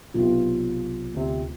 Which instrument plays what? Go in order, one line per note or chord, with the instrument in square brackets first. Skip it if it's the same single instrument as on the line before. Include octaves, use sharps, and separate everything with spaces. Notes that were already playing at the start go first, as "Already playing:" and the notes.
[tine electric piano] B1 C3 [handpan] B3 F4
[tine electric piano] D2 C3